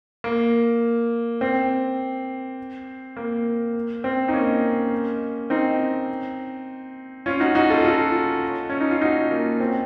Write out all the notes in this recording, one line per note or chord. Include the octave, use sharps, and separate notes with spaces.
A#3
C4
A#3
C4
D#4
A#3 C#4
C4 D#4
C#4 F4
D#4 F#4
D#4 F#4
F4 A4
F4 A4
C#4
D#4
F4
D#4 F#4
A#3
C4